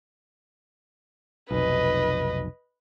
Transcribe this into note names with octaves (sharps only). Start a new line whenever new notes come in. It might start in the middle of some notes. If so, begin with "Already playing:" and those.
F1 B1 B4 D#5